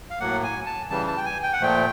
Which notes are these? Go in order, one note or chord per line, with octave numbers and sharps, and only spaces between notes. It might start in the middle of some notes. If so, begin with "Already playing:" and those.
F5
A2 F#3 A#3 F#5
G#5
A5
C#3 E3 G3 A5
A5
G5
G#5
G5
F#5
A#2 F3 A3 G5